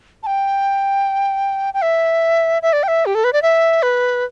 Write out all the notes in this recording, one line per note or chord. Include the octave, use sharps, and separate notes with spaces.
A5
G5
G5
E5
E5
D5
G5
E5
G4
A4
B4
D5
E5
B4